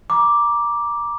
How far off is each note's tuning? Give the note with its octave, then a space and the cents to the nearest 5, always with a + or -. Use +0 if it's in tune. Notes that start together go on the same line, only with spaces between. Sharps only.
A#5 +25 D6 +0